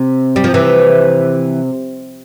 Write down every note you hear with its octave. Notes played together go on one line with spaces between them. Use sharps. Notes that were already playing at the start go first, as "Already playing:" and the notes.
Already playing: C3
G3
F3
C3 E3